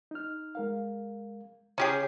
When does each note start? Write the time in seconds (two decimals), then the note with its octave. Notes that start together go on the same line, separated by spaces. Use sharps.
0.11 D#4 F6
0.55 G#3 A#4 F5
1.78 C#3 C#4 G4 G#4